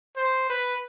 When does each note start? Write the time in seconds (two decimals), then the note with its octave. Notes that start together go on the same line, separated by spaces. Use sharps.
0.17 C5
0.49 B4